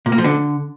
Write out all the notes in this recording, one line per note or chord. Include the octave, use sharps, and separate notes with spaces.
A#2
A#3
F3
D3